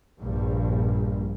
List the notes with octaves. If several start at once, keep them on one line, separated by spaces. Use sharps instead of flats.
A#1 G2